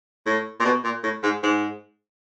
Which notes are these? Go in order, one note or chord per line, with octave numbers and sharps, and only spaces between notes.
A2
A#2
B2
A#2
A2
G#2
G#2